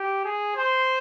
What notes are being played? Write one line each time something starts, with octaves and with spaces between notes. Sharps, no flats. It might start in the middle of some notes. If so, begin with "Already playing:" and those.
Already playing: G4
G#4
C5